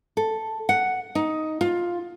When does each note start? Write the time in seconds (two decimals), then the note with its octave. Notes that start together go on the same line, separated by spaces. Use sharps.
0.17 A4
0.69 F#5
1.15 D#4
1.61 F4